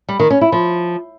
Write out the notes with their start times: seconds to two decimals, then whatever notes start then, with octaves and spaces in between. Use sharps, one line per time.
0.09 G3
0.19 D#3
0.30 C#4
0.41 E4
0.52 F3